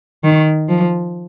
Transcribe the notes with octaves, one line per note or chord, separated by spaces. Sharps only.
D#3
F3